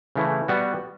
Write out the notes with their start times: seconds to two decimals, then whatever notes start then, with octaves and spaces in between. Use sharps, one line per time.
0.16 C#3 E3 A3 E4
0.48 G3 B3 F#4